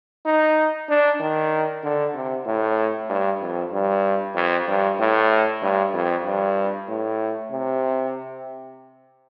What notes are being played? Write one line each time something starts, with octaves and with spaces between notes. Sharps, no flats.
D#4
D4
D#3
D3
C3
A2
G2
F2
G2
F2
G2
A2
G2
F2
G2
A2
C3